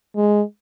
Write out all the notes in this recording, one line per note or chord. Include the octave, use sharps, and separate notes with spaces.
G#3